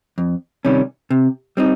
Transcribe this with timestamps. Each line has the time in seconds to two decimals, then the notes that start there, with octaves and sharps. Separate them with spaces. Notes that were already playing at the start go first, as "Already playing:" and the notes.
0.18 F2
0.65 C3 D#3 G3 C#4
1.10 C3
1.57 G3 C4 D#4